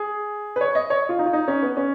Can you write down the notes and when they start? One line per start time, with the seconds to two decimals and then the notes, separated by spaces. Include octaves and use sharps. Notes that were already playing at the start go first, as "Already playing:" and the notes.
Already playing: G#4
0.56 B4
0.61 C#5
0.75 D#5
0.90 C#5
1.09 F4
1.19 D#4
1.26 F4
1.33 D#4
1.48 C#4
1.62 B3
1.77 C#4